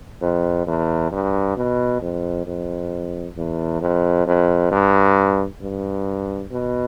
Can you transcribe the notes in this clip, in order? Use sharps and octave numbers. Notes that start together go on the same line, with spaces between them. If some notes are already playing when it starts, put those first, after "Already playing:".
F2
E2
G2
B2
F2
F2
E2
F2
F2
G2
G2
B2